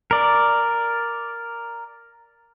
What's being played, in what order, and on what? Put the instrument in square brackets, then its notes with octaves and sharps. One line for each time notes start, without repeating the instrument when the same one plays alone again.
[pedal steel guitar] A#4 D5